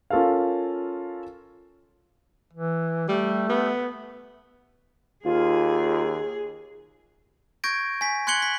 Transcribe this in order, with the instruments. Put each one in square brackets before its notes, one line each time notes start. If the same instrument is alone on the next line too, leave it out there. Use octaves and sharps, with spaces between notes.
[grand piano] C#4 F4 A4 A#4 F5
[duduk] E3
[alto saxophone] G3 [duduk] A3
[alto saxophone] B3
[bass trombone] D#2 [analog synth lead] F4 [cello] G#4
[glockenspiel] C#6 G6 G#6 A#6 D7
G#5 B6
C6 F#6 G#6 C#7 F#7 G7
B6